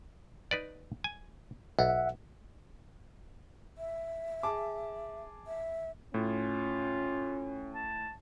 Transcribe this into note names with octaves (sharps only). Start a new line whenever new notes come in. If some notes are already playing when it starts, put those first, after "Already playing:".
D#4 B4 D5
G#5
B1 E5 F#5
E5
G#4 A5 D6
E5
A2 C#4 F4
A5